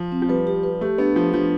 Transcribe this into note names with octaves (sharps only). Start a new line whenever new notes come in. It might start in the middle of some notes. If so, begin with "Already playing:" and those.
Already playing: F3
C4
F3
G3 B4
G4
B4
A3 G4
B3 D4
F3 G4
F3 D4